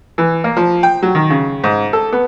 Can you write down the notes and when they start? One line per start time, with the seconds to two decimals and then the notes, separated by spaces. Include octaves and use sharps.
0.18 E3
0.44 A#3
0.57 F3
0.83 G5
1.02 F#3
1.15 D#3
1.30 C#3
1.64 G#2
1.93 A4
2.12 B3